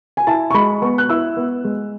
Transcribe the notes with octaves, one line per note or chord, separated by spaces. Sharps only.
G#5
E4 A5
C#6
G#3 B5
B3 C#6
F#6
E4 E6
B3
G#3